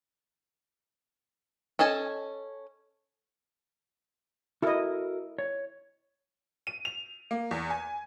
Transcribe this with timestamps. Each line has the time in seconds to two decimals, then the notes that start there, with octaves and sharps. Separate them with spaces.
1.79 C#4 A4 D#5 G#5 A5
4.62 E4 F#4 A4 A#4 D#5
5.38 C#5
6.67 D#7
6.85 F7
7.31 A#3
7.51 E2
7.70 G#5